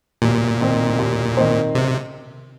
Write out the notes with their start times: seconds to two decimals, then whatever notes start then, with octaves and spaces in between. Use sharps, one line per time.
0.22 D#2 A#2
0.61 D#3 C4 D#4 C5
0.98 D#2
1.37 D#3 C4 D#4 C5
1.75 C3